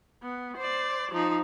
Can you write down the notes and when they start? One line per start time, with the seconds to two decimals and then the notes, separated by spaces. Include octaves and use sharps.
0.23 B3
0.57 C5 D5
1.12 F3 D#4